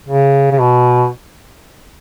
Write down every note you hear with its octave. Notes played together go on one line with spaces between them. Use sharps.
C#3
C#3
B2